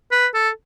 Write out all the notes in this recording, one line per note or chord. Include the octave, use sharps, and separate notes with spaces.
B4
A4